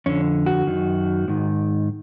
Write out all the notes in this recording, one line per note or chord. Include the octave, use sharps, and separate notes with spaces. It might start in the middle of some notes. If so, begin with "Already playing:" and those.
F2 D3 C#4
F#4
F#2 D#3
G#2 D#3